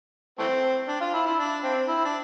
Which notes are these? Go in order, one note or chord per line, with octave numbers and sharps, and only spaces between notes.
E3 A3 C4
D4
F4
E4
E4
D4
C4
E4
D4